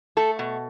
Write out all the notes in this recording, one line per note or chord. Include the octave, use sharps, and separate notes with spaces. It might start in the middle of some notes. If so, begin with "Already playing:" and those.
A3 A4
B2